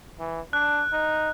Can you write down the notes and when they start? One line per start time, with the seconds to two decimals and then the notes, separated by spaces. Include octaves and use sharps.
0.20 E3
0.53 D4 F#6
0.92 D#4